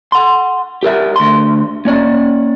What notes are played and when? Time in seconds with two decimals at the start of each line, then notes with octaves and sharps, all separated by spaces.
0.12 F#5 C6
0.83 G4 A#4 E5
1.16 D2 C6
1.85 A#3 C#4 D5